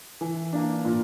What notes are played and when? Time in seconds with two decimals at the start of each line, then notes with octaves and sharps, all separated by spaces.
0.21 E3
0.53 A#3 D4
0.85 A#2